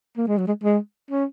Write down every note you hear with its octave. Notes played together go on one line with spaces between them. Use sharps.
A#3
G#3
F#3
G#3
G#3
C#4